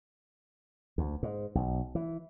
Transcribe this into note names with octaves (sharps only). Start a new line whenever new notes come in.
D2
G#2
B1
E3